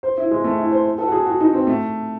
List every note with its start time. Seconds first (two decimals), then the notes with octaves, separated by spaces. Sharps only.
0.03 C5
0.17 E4
0.31 G#3
0.44 A3
0.58 E4
0.71 C5
0.98 A4
1.08 F#4
1.12 G#4
1.26 F#4
1.40 D#4
1.53 C4
1.67 A3